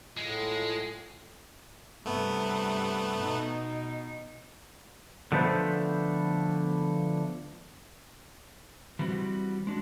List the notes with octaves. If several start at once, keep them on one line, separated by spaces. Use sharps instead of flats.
A2 G#3 F4
G2 C3 A3 B3
B2 D#4
D3 F3 A3 B3 C5
E3 G3 C4 F#4
G#3 D4 F#4